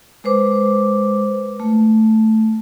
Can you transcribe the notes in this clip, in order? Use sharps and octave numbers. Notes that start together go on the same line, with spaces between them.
G#3 B4 C5 D6
A3